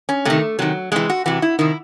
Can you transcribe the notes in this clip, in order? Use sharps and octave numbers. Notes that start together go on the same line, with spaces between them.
C#4
C3 D#3 A3
C3 D#3 F#3
C3 E3 G#3
F#4
C3 E3 F#4
E4
C3 D#3 E4